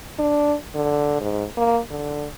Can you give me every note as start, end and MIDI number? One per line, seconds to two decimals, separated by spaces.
0.19 0.56 62
0.75 1.20 50
1.21 1.46 44
1.58 1.79 58
1.91 2.27 50